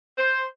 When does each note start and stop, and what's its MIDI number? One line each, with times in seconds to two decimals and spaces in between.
0.18 0.45 72